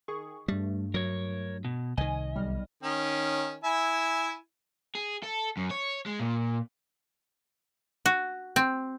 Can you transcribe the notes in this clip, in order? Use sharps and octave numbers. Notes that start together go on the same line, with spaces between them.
D#3 G#4 C#6
G2 G3 A3
F#3 A#4 C#5
B2
C2 D#3 D#5 G#5
B1 G3 F6
D#3 C#4
E4 E5 G#5
G#4
A4
F#2
C#5
G#3
A#2
F#4
C4